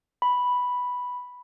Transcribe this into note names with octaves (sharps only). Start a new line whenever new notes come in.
B5